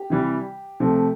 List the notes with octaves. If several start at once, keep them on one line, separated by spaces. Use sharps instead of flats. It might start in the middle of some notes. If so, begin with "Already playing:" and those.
Already playing: G4
C3 E3 G3
C3 F3 A3